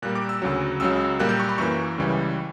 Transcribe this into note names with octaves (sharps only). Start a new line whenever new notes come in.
A#2 G3 A#3 F#6
D6
E6
D2 C#3 F#3
C#2 C#3 F#3 E6
A#2 G3 A#3 F#6
G6
C#6
B5
F#2 E3 A#3 C#6
C#2 C#3 E3 G3